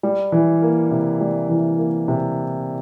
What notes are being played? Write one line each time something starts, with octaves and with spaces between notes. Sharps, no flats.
G3
E3
A#3
C3
G3
E3
A#3
C3